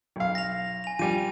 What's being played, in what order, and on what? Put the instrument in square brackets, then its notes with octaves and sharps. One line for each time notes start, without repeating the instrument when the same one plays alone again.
[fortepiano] B1 F5
[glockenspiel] A#6 F7
G#5 F7
[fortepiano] F3 G3 [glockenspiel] G#5 D#7